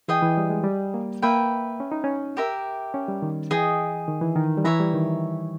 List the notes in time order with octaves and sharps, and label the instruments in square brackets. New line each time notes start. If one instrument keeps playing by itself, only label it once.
[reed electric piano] E3 [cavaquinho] G#4 D#5 G5
[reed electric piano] E3
G3
G#3
G3
A#3
[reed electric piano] A#3 [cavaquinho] B4 E5 G5
[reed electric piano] C#4
D#4
C#4
[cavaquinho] G4 A#4 E5
[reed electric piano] C#4
G3
D#3
[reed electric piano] E3 [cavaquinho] G#4 D#5 G5
[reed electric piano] D#3
E3
D#3
G3
[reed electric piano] E3 [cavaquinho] C#5 E5 A#5
[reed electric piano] G3
D#3